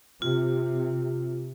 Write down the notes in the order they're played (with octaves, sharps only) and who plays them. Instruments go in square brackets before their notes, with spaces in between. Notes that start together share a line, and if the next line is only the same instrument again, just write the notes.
[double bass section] C3 [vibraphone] F4